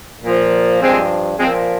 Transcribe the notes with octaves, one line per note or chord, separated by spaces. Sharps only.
A#2 F3
G2 F3 G#3 C4
A#2 F3 G#3 C4